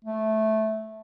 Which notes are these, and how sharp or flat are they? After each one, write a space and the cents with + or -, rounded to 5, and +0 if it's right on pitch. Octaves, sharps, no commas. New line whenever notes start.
A3 -10